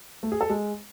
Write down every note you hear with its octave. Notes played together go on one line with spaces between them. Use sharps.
A3
G#4
A4
G#3